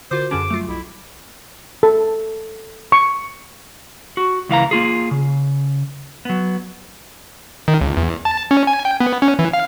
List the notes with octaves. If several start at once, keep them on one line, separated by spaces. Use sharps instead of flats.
D3 F4 F#4 A#4 C5 D6
F#2 D3 C#4 G#4 D6 E7
F#3 G3 A3 F4
B1 E4
A4
C#6
F#4
C#2 E3 F5 A#5
A#3 F4 G#4
C#3
F#3 B3
D#3
C#2
E2
A5
C#4
G#5
G5
B3
C#4
E3
F5